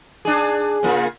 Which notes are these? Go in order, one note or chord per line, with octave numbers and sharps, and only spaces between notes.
D4 G#4
C#3 A#3 F4